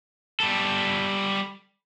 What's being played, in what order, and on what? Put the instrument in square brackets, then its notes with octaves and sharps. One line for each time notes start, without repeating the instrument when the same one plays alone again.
[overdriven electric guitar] G3 A4